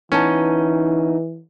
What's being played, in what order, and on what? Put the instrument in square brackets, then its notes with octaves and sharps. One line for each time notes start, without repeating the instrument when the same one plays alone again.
[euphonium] E3 [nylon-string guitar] B3 D#4 A5 [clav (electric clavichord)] C#4